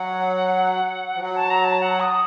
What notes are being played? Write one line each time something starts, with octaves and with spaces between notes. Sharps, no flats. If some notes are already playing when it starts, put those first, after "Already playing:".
Already playing: F#3 F#5
F3
F#3
A5
A#5
A5
F#5
D#6